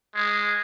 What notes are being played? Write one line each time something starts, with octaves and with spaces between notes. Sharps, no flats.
G#3